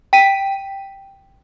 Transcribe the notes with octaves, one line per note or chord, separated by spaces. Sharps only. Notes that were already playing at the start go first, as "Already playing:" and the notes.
G5 B6 D#7